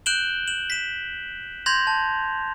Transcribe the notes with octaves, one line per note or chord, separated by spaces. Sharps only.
F#6 G6 D7 E7 F#7 G7
E7 F#7
B6 E7
C6 G6 G#6 A#6 F7
A5